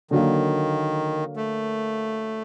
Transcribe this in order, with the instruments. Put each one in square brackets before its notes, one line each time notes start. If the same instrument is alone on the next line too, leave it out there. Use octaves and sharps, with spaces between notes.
[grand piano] D3 F#3 A#3 [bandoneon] D#3
[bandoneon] A3